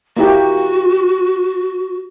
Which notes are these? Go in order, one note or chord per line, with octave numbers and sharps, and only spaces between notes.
A#3 E4 F#4 G4